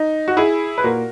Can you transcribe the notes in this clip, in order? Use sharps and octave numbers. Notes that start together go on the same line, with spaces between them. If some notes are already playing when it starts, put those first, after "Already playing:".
Already playing: D#4
F#4
E4 G#4
B4
A#2 F#4 A#4